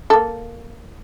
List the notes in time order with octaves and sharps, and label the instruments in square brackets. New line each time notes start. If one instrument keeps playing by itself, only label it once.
[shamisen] A#3 A4